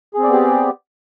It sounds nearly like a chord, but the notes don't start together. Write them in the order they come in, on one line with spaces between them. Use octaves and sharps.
G#4 C4 D5 B3 G4